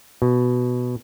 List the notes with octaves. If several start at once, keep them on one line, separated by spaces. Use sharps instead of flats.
B2